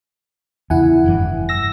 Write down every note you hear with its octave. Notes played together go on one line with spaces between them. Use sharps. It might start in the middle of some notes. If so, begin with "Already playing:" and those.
E2 C#3 E4 F#5 G#5
F1 G2 E3
E6 A#6